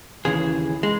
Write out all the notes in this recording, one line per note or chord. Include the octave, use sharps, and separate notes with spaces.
D#2 C#3 E3 G#4
G#3